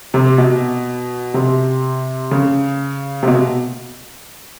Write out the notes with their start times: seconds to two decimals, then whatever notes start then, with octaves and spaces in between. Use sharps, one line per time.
0.14 C3
0.38 B2
1.34 C3
2.31 C#3
3.23 C3
3.27 B2